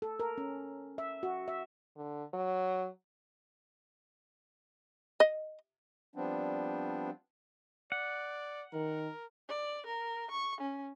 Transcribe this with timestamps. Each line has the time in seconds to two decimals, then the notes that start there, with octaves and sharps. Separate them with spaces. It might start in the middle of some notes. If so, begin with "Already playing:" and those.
0.02 A4
0.20 A#4
0.38 C#4
0.98 E5
1.23 F#4
1.48 E5
1.97 D3
2.34 F#3
5.20 D#5
6.16 F3 G3 B3 C4 D4
7.92 D5 F#5
8.73 D#3 A#4
9.49 D5
9.86 A#4
10.31 C#6
10.61 C#4